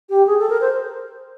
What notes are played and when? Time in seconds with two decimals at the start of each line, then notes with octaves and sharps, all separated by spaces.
0.10 G4
0.27 G#4
0.39 A4
0.50 A#4
0.61 C5